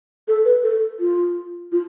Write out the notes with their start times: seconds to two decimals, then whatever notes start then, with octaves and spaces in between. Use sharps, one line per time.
0.28 A4
0.45 B4
0.63 A4
1.00 F4
1.72 F4